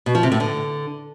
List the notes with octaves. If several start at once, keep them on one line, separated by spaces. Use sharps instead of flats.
B2
F3
C3
A2
D3